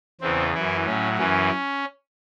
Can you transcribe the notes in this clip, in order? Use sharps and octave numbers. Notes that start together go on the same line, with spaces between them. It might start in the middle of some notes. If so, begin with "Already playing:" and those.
E2 C#3 E3 C4
F#2 E3 E4
A2 F#3 C#4
F#2 E3 C#4